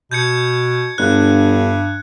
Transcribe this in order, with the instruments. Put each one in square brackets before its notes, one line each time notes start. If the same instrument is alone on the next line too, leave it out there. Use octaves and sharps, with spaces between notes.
[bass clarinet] B2 [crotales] G6 G#6 C#7
[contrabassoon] G1 [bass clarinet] G2 [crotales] F#6